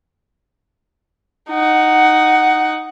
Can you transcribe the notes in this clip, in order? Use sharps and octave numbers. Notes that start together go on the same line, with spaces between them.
D#4 F#5